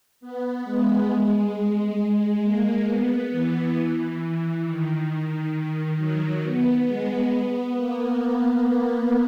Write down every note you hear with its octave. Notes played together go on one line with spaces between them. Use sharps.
B3
G#3
G#3
G#3
A#3
B3
E3
E3
D#3
D#3
F#3
B3
G#3
B3
A#3